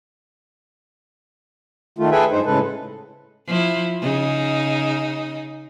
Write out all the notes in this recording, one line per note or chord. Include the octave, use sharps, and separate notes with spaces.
D#3 A3 F4
G#4 A4 B4 E5 G5 G#5
G2 D#4 C5
A2 C#3 G#3 A4 B4
F3 E4
C#3 D#4